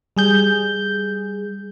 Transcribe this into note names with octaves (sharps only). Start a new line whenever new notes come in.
G3 G#4 G6